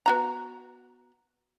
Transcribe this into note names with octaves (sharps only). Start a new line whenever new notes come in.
B3 F#4 A#5